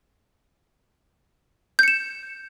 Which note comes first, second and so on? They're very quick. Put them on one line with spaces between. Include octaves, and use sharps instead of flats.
G6 C#7 E7